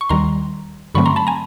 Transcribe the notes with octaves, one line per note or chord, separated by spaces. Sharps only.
C#6
D#2 D#3 G3 A#5 C6
G2 D3 F#3 A3 C4 B5 C#6
A#5 C6
A5 B5
G#5 A#5